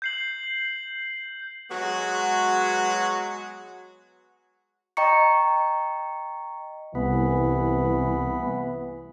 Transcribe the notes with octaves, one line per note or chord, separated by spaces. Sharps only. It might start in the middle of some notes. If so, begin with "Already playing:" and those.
G6 C7 F#7
F#3 G#3 B3 F#4
D#5 G5 A#5 C#6 C#7
C2 E3 B3